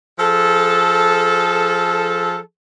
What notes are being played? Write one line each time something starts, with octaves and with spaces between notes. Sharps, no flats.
F3 G#4 A4